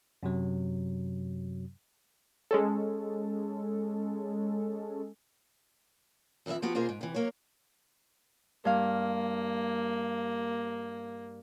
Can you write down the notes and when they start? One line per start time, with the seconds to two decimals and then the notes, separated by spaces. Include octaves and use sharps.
0.23 F#2 C3 F#3
2.51 G#3 C#4 A4
6.46 F2 E3 G3 E4 E5
6.62 F3 B3 F#4 G4
6.75 B2 A#3 F4 G#4 C5
6.89 G#2
7.01 C3 E3
7.14 F#3 A#3 C#5
8.65 G2 A#3 F5